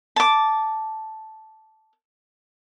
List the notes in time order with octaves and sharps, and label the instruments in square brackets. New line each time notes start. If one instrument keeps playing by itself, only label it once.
[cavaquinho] A5 D6